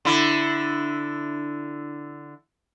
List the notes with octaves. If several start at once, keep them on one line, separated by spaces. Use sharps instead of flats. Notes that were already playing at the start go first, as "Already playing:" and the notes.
D3 E4